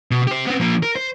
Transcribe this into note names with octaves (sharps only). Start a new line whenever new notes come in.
B2
G4 C5
B3 C4
F3 A#3
A#4
C5